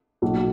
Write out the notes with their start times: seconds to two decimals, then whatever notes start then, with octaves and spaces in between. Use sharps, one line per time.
0.22 B1 A#2 F#3